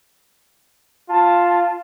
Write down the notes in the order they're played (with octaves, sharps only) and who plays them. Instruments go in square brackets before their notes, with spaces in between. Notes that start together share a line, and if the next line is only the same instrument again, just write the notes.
[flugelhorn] F4 [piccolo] A5